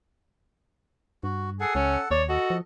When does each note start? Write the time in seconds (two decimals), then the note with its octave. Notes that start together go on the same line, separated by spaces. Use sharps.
1.23 G2 F#4
1.60 G#4 A4 F#5
1.75 C#2 C#4
2.11 D#2 C#5 D5 A5
2.29 F#4 A4 D#5
2.50 F3